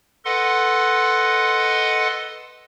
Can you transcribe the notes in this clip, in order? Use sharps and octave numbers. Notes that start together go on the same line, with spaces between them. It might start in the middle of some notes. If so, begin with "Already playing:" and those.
A4 B4 D#5 F#5 C6